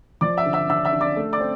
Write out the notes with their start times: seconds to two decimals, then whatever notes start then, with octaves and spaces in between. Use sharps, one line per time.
0.21 F3 D5 D6
0.37 E5 E6
0.46 D3
0.53 E5 E6
0.69 D4 E5 E6
0.85 E5 E6
0.93 D4
1.01 D5 D6
1.17 A3
1.33 D5 D6
1.40 C4